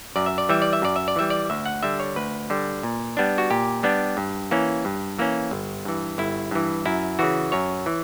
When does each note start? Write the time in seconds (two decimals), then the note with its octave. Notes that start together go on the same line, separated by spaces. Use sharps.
0.16 F#2 D5
0.26 E5
0.38 D5
0.49 E3 G3 E5
0.62 D5
0.73 E5
0.82 F#2 D5
0.96 E5
1.08 D5
1.16 E3 G3 E5
1.30 D5
1.50 D2 E5
1.66 F#5
1.83 D3 G3 E5
2.00 C#5
2.16 D2 B4
2.50 D3 G3
2.83 A#2
3.17 G3 B3 D4
3.38 F#4
3.50 A#2 G4
3.83 G3 B3 D4
4.17 G2
4.51 E3 A#3 C#4
4.85 G2
5.19 E3 A#3 C#4
5.51 G1
5.85 G2 E3
6.18 G1 E4
6.51 G2 E3
6.86 F#2 E4
7.19 C#3 E3 F#4
7.52 F#2 C#5
7.86 E3